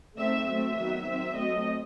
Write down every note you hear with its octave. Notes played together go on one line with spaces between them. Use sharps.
D#3 A3 C4 E5
F#3 A3 C4 E5
D#3 F#3 B3
D#3 F#3 C4
F#3 A3 C4 D#5